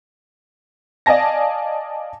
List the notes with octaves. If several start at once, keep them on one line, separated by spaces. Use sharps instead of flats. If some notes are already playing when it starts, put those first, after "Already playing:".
D5 D#5 F5 G#5 A5 A#6